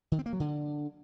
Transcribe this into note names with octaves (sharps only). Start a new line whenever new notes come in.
D#3
C4
A#3
F#3
D3